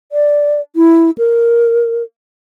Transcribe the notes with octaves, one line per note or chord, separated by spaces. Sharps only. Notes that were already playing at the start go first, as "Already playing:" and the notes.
D5
E4
A#4